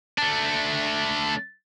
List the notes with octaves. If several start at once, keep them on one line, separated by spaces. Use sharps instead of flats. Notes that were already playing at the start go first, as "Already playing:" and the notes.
A3 D4